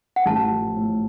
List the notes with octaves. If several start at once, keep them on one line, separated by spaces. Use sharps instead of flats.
F#5
A1 A5
F3
A2